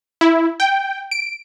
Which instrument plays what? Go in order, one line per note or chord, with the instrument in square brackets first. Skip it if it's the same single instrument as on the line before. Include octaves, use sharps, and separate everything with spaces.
[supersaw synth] E4
G5
D7